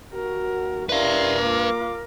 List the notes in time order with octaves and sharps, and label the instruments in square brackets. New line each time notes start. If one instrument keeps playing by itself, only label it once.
[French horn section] D#2 F#4 [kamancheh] A#4
[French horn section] C#4 G4 D5 [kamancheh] E4 C6 [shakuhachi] A#4 [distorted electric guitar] B4 F5
[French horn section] A#3 [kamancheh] F4 D6